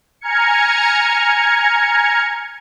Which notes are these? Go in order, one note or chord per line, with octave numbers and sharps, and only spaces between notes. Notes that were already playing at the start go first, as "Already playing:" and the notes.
G#5 A#5 F6 G#6 C#7